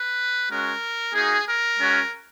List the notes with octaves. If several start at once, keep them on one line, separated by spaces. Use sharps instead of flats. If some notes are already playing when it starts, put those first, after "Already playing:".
Already playing: B4
G#3 C#4 F#4 A#4
A#3 D#4 F#4 G#4
A#4
G#3 C#4 F#4